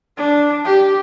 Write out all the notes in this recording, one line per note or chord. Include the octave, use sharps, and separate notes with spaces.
D4
G4